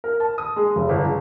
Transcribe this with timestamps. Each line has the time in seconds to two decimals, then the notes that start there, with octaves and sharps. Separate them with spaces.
0.04 A#4
0.20 A5
0.38 D#6
0.56 G#3
0.76 F1
0.89 G1
1.06 C#3